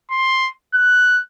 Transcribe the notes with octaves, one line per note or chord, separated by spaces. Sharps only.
C6
F#6